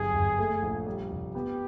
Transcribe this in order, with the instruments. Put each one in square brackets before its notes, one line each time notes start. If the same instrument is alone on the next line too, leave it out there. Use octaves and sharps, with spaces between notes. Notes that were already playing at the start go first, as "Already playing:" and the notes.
Already playing: [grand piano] G1 F#2 [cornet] G#4
[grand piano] G1
A3
A#1
G3
F1
[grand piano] B3 [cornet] G4